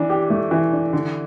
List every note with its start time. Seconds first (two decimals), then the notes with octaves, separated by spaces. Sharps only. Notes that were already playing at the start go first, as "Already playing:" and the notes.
Already playing: E3 D4
0.10 G4
0.30 A3
0.51 E3
0.73 D4
0.93 D3